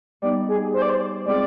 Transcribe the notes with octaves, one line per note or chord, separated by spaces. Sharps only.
G3 B3 D#4 D5
G#4
C5
D5
C5
G#3 C4 F4 G#4 D5